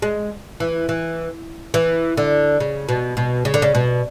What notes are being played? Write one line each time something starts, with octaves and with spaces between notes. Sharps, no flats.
G#3
E3
E3
E3
D3
C#3
B2
B2
C#3
D3
C#3
B2